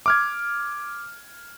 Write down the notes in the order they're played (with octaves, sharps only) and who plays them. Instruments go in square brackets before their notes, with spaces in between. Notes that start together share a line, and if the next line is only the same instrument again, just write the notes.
[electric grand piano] D6 F6 G#6